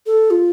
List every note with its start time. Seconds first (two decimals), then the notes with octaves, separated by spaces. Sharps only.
0.06 A4
0.30 F4